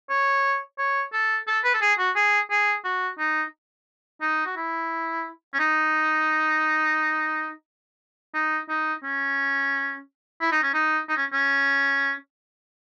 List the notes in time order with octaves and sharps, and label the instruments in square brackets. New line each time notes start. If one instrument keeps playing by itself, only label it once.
[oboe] C#5
C#5
A4
A4
B4
A4
G#4
F#4
G#4
G#4
F#4
D#4
D#4
F#4
E4
C#4
D#4
D#4
D#4
C#4
E4
D#4
C#4
D#4
D#4
C#4
C#4